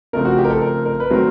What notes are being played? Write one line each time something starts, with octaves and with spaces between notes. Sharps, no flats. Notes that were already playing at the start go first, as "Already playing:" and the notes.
C#3 F3 A3 C4 A#4
F#4
G4
A#4
A4
A#4
A#4
B4
D#3 F#3 A3 C4 A#4